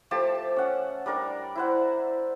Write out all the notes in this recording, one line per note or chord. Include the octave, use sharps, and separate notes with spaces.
F3 A3 G4 A5
C#4 F#5
G3 D4 A#4 D5
E4 C5 F#5